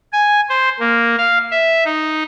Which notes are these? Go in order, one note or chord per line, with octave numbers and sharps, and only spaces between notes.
G#5
C5
A#3
F5
E5
D#4